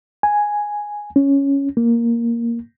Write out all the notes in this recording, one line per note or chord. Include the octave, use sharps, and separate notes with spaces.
G#5
C#4
A#3